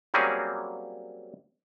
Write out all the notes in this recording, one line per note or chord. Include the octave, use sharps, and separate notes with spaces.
F#3 G3 A#3 C4 C#4 G#4